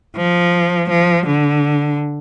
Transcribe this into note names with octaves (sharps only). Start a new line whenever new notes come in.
F3
F3
D3